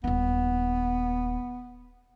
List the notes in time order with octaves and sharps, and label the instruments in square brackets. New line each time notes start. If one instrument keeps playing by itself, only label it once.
[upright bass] D#1 D#4 [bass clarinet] B3